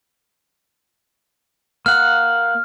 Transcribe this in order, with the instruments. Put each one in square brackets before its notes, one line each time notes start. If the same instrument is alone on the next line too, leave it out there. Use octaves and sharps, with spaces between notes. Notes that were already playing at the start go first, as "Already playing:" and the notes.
[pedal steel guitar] A#3 F#5 [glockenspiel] F6